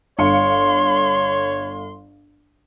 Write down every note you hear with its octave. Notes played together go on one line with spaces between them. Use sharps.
G1 C#5 F5 C6 C#7